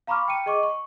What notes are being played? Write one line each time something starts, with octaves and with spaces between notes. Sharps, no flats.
F5 A#5 B5 C#6 D6 F6
G5 C#7 D#7
G#4 D#5 C#6 D6
C#6